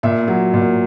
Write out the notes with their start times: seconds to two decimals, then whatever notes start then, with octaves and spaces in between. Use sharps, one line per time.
0.03 A#2 E5
0.28 F#3
0.54 A#2